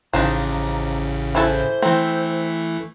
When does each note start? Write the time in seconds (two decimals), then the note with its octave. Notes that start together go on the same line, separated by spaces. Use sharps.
0.13 A1 C#3 F3 D4 D#4 A#5
1.35 E3 E4 A4 C5
1.82 E3 A3 C4